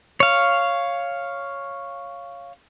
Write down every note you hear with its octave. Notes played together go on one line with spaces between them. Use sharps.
C#5 F5